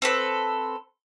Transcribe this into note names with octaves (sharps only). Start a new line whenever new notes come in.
C4 A4 B4